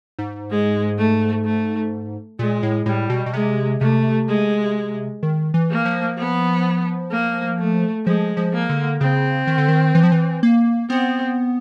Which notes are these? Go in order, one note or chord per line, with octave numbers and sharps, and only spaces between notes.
G#2
G#3
A3
A3
A#2 G#3
A2
A2 G3
B2
B2
C3 G#3
C3 A3
G#3
D#3
E3
A#3
F3
B3
A#3
A3
F3 G#3
F3
A#3
D3
C#3 C4
D#3
D3
D#3
E3
F3
E3
A#3
B3 C4